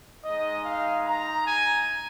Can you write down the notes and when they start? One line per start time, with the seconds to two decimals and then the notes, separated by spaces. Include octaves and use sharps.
0.24 G#3 D#4 D#5
0.64 F5
1.06 A#5
1.46 G#5